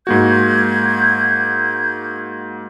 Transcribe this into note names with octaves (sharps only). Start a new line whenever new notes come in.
G#2 A#3 F#4 G6 G#6